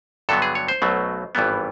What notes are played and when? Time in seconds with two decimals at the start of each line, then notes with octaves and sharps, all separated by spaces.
0.29 G2 D3 F#3 B3 A4
0.42 G#4
0.55 C#5
0.68 C5
0.82 B1 B2 F#3 A3
1.35 G#1 G2 E3 G3 B3